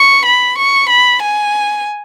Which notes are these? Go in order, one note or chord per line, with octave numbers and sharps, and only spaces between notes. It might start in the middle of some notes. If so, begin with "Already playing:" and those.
Already playing: C#6
B5
C#6
B5
G#5